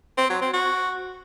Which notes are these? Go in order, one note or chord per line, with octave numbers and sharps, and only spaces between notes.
C4
F#3
C4
F#4